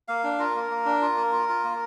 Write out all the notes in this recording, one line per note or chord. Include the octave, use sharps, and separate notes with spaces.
A#3 F5
D4
F4 A#4
A#3
A#3
D4
F4
A#3
F4
F4
A#3